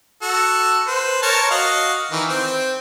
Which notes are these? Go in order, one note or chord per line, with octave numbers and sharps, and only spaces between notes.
F#4 A4
B4 C5
A#4 C#5 A5
F#4 D#5 F5
D#3 E3
C4